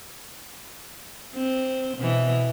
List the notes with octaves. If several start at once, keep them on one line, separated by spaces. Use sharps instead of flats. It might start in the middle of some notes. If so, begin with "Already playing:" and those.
C4
B2 E3